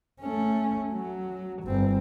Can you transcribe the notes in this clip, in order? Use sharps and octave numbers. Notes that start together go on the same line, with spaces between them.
A3 C#4
F#3
G1 C4